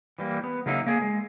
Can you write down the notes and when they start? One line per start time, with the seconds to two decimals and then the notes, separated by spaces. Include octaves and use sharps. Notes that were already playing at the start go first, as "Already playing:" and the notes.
0.19 E3 G3 A#3
0.44 B3
0.66 C#3 F#3 A#3 D#4 E4
0.87 A#3 G#4
1.01 G#3